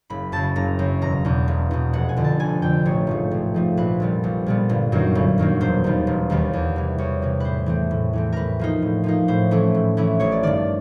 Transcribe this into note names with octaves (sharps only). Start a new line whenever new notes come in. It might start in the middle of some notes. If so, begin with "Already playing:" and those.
F#1 B5
F#2 C#3 A5
F#1 A#5
F#2 C#3
E1 A#5
E2 B2
E1
E2 B2
F1 F#5
G#5
F2 D3
A5
F1 G#5
F2 D3 G5
A1 C#5
G#2 F3 A3
A1
G#2 F3 A3
A#1 B4
A#2 G3 B3
A#1
A#2 G3 B3
G1
F#2 D#3 F#3 A#3
G1
F#2 D#3 F#3 A#3
E1 C5
D#2 D#3 G3 B3
E1
D#2 D#3 G3 B3
E2
C3 E3
E2 C#5
C3 E3
A2 B4 C5
E3 A3 C4
A2
E3 A3 C4
A2 A#4 B4
F3 A#3 D#4
A2
F3 A#3 D#4
A2 C5
E3 A3 C#4 E4
A2
E3 A3 C#4 E4
A1 C#5
D5
G2 D#3 D5